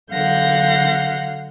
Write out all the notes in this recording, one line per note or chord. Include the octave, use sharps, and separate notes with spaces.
D3 F#3 F5 F#5 G6 A#6